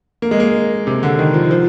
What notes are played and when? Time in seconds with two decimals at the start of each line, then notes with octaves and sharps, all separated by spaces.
0.22 A#3
0.31 G#3
0.40 A#3
0.87 C3
1.03 D3
1.19 D#3
1.34 F3
1.51 F3